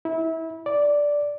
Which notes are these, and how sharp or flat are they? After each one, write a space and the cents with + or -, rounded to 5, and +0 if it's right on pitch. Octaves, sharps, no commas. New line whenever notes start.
E4 -25
D5 -5